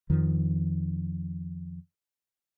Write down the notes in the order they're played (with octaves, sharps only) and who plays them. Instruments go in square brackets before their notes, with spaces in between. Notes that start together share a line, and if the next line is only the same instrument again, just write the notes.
[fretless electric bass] F2 D#3 F3